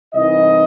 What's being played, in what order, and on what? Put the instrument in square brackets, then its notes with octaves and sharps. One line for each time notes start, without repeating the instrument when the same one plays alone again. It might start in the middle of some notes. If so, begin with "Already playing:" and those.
[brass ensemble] C2 C3 E3 D#4 D#5